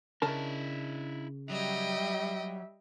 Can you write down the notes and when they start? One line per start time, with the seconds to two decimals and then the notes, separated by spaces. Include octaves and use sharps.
0.22 C#3 D4 E4 A#4 A5
1.50 F#3 G3 D#5 E5 G5